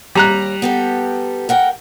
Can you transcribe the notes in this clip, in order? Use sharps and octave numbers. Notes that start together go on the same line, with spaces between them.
D#2 G3 A#5 F#6
B3 G4 A4
A#4 F#5 G5